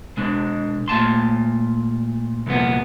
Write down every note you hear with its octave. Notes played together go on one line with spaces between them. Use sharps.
B2 G#3 D4
A#2 A3 A5 C6
C2 F2 A#2 B3